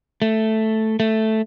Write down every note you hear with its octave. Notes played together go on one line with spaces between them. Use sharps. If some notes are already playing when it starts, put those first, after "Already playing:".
A3
A3